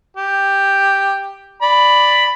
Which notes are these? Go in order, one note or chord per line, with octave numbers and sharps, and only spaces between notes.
G4
D5 B5